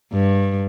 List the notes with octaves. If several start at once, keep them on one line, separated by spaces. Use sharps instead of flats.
G2